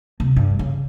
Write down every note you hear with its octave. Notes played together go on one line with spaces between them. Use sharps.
C3
G2
C#3